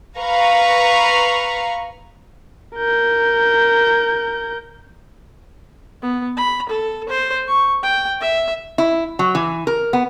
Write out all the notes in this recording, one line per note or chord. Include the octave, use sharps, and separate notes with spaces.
B4 F5 A#5 C#6
A#4 G6
B3
B5
A4
C5
C#6
G5
E5
E4
F#3
E3
A#4
B3